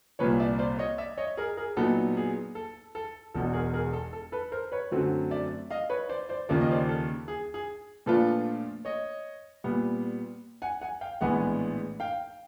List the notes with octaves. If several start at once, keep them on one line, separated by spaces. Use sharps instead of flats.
C2 A#2 F3 B4 C#5
D5 E5
C5 D5
C#5 D#5
D5 E5
C#5 D#5
G#4 A#4
G#4 A#4
A#2 F#3 B3 D#4 A4
G#4
A4
A4
E1 E2 B2 A4
G#4 A#4
G#4 A#4
A4
A4
A4 B4
A#4 C5
B4 C#5
F#2 D3 F#3 A3 C4
D5 E5
D#5 F5
B4 C#5
C5 D5
C5 D5
D#2 C#3 F3 A#3 D5
D#5
C5 D5
A4
G#4
G#4
A#2 F3 A3 D4 F4 A4 B4
C#5 D#5
A#2 G3 B3
F#5 G#5
F#5 G#5
F5 G5
A#1 A2 E3 G#3 B3 F#5 G#5
F5 G5